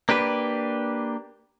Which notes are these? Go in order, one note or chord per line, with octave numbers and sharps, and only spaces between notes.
A#3 D4 G4 B4